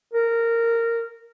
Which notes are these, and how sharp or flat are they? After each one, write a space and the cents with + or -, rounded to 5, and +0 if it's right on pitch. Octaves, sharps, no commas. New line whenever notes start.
A#4 -15